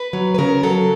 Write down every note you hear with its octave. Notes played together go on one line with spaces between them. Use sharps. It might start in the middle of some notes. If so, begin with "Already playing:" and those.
Already playing: B4
F#3
B4
C#3 A#4
F#3 A4